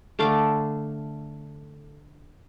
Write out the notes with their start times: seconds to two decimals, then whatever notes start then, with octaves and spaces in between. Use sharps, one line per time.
0.19 D3 A3 F5 D6